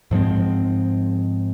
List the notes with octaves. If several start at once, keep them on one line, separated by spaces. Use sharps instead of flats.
G#2 F3 G#3 C4